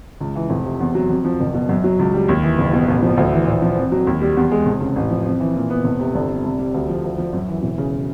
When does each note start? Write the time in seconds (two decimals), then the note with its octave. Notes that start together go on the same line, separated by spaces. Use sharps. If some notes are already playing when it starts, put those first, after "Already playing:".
0.21 C#2
0.36 E3
0.50 F1
0.65 C3
0.80 E2
0.95 F#3
1.10 F2
1.25 F3
1.40 F#1
1.54 B2
1.69 F#2
1.84 F#3
1.99 C#2
2.14 G3
2.28 D#2
2.43 E3
2.58 F#1
2.73 B2
2.88 A1
3.02 F3
3.17 D2
3.33 E3
3.47 A#1
3.62 F3
3.77 F2
3.92 F#3
4.07 D#2
4.22 G3
4.37 E2
4.51 G#3
4.66 F1
4.81 C#3
4.96 A1
5.11 F3
5.25 F2
5.40 E3
5.55 A#2
5.70 B3
5.84 F1
5.99 C3
6.14 G1
6.30 C3
6.44 C2
6.59 G3
6.74 D2
6.89 F3
7.04 D2
7.18 F3
7.33 F#2
7.48 E3
7.63 E1
7.78 C#3